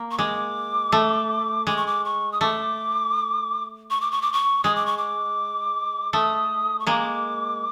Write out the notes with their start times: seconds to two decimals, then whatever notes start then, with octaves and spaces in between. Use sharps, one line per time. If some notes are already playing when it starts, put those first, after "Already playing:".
Already playing: A#3
0.11 C#6
0.18 G#3 D6
0.92 A3
1.67 G#3 D6
1.77 C#6
1.87 D6
2.05 C#6
2.32 D#6
2.41 A3 D6
3.90 C#6
4.01 D6
4.11 C#6
4.22 D6
4.33 C#6
4.64 G#3 D#6
4.76 D6
4.86 C#6
4.98 D6
6.13 A3 D#6
6.80 C#6
6.87 G#3 A#3 D6